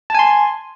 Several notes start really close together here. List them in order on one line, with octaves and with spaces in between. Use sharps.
A5 G#5 C6